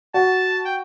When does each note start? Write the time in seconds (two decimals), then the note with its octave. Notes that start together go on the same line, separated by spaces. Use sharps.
0.14 F#4 A5
0.65 G5